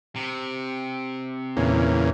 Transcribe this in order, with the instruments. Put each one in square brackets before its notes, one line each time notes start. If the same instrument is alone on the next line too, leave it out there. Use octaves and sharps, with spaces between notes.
[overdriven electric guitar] C3
[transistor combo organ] E2 A#2 C#3